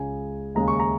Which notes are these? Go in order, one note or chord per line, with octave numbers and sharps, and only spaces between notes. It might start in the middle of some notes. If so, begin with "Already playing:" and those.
Already playing: C#2 C#3 G#3 G#5
D#2 C#3 G#3 A#5
C#6
A#5